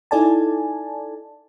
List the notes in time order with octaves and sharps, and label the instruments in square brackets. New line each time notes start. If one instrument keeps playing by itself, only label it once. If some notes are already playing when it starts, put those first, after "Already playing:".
[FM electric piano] D#4 E4 A4 D5 G#5 A5